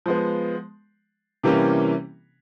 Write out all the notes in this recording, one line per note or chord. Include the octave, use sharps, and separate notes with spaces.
F3 G#3 B3
C3 E3 G3 A#3 C#4